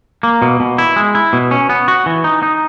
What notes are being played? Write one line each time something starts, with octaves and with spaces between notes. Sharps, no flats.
A#3
B2
B2
E4
G#3
E4
B2
C#4
B3
F#4
E3
D#4
D#4